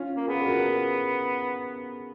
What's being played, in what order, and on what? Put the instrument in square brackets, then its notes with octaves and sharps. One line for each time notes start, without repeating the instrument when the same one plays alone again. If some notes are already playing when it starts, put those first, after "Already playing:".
Already playing: [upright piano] C#4 F4
[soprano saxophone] A#3
[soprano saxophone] B3 [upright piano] F4 G#4
[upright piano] B4
F#4 A#4